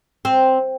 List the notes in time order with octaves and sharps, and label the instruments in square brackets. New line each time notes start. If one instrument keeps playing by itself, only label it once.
[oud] C4